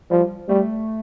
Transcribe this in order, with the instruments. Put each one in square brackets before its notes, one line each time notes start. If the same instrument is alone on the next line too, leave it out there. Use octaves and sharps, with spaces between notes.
[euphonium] F3 [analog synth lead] G3
[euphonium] G3 [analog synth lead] A3